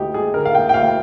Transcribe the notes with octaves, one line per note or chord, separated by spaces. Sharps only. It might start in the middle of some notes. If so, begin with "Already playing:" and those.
Already playing: D2 G3 D#4 G4
G#4
D3 A#4
F5
G5
G5
D2 F5